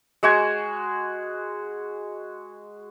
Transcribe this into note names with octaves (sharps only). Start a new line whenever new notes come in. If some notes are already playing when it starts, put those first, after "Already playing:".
G#3 F#4 G#5